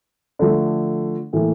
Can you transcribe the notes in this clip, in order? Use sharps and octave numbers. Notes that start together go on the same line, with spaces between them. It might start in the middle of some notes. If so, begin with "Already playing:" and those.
D3 F3 A3
A2 E3 A#3